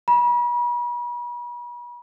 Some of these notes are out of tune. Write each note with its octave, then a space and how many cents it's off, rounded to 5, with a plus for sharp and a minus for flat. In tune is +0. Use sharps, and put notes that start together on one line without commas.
B5 -40